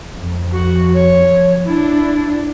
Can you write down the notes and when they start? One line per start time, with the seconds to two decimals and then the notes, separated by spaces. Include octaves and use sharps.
0.17 F2
0.52 F#4
0.94 C#5
1.30 F3
1.65 D4 E4